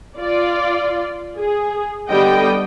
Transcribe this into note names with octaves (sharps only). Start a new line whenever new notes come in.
F4 D5
G#4
D3 G3 B3 D#5 G5